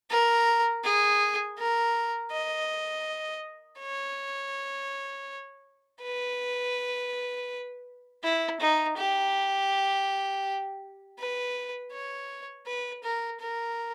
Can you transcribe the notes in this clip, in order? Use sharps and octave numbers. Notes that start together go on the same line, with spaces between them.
A#4
G#4
A#4
D#5
C#5
B4
E4
D#4
G4
B4
C#5
B4
A#4
A#4